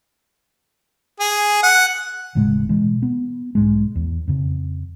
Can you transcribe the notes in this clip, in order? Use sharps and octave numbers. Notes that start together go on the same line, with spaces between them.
G#4
F#5
E1 A2 C#3 G#3
B2 E3 G#3
B3
B1 G#2 G#3
E2
F2 C#3